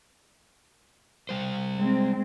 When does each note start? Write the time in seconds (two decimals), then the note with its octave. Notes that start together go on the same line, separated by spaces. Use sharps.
1.29 G3 C5
1.76 G#3 C4